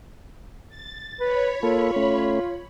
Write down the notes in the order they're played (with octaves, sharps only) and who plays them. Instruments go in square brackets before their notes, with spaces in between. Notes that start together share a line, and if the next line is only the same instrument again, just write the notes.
[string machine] A6
[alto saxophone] B4 [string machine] C#5 B5
[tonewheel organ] A#3 A4 [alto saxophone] F4
[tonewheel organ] A3 C#4